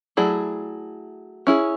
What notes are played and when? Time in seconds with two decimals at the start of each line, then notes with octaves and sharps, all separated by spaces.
0.17 F#3 A3 E4 G#4 D5
1.47 C#4 E4 G#4